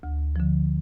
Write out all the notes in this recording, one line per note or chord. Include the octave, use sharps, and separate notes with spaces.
D2
D3 F3